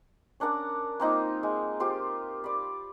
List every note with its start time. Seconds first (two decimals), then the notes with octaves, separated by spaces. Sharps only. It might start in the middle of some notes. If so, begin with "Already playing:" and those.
0.40 C#4 D4 A#4 F#5
1.00 A#3 C4 D#4 F4
1.43 G#3
1.80 C4 F4 G4
2.44 D5 B5